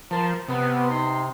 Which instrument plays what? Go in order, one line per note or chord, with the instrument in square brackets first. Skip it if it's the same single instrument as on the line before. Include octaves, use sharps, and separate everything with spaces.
[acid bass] F3 [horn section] A#4 C5 A5
[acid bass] C3 [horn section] B3
[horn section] D#4 C6